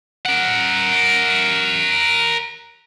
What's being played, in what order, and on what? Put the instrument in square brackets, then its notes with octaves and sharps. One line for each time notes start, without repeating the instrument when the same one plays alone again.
[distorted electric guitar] A#4 F#5